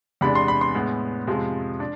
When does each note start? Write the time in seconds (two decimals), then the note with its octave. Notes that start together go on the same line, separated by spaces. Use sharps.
0.21 E2 C3 G#3 B3 D4 B5
0.35 C6
0.48 B5
0.61 C6
0.75 A2 G#3 B3
1.27 F2 C3 F3 G#3
1.80 D4